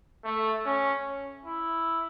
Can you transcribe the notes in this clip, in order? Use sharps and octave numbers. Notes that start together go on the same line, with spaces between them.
A3
C#4
E4